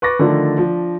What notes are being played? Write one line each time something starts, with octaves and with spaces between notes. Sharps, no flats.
B4 C#6 D6 A6 A#6
D3 D#3 F3 A3 D4
F3 D4